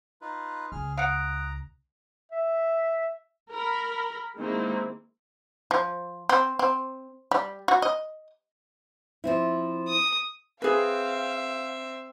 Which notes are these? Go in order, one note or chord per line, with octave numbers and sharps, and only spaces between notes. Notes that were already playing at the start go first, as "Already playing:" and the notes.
D#4 F4 B4
C#2 G#4 F6
F5 F#5 A#5 D#6 F#6 D7
E5
A#4 B5
D#3 G#3 A#3 C4 E4
F3
C4
C4
G3
F#4
D#5
F3 C4 E4
D#6
C4 G#4 B4 E5 F5